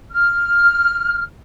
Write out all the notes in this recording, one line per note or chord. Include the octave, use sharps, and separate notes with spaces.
F6